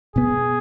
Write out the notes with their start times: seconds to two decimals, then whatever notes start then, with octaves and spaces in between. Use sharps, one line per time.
0.16 B2 B3 G#4